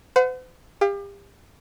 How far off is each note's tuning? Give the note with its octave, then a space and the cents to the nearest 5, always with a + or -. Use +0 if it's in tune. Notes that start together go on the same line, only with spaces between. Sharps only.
C5 -45 F#5 -15
G4 +35 F5 +0